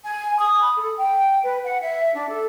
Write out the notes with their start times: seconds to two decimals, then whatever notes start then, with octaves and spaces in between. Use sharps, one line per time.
0.04 G#5
0.38 D#6
0.62 B5
0.77 A4
0.97 G5
1.43 B4
1.64 F#5
1.81 E5
2.14 D4
2.28 A4